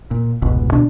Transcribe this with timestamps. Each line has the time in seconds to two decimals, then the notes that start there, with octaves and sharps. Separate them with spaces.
0.11 A#2
0.42 F1 C#2 G#2 B2
0.72 D2 B2 D4